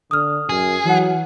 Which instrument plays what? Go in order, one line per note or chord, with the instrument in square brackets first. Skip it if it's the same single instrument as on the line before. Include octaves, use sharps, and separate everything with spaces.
[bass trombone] D3 [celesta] D#6 F6
[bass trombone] F#2 [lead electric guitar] G#4
[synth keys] E3 F#5 [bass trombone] F#3